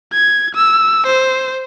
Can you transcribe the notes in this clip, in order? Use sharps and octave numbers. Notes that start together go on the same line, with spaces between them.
G#6
E6
C5